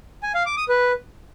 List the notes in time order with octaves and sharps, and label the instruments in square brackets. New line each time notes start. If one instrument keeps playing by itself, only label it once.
[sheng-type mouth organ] G#5
F5
D6
D#6
B4